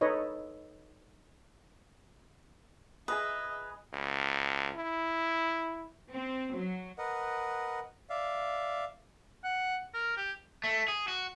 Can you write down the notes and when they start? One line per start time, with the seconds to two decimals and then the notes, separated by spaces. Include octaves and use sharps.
0.01 D#4 A4 B4 C#5 D#5
3.08 G#4 B4 D#5 E5 A#5 D#6
3.93 C#2
4.76 E4
6.11 C4
6.56 F#3
6.97 A#4 B4 D#5 F#5
8.10 D5 E5 F5
9.44 F#5
9.94 A#4
10.17 G4
10.64 A3
10.88 G#4
11.08 F#4